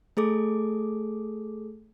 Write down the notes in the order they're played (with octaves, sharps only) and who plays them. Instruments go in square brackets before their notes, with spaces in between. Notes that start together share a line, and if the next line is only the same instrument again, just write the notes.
[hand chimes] A3 G#4 A4 D6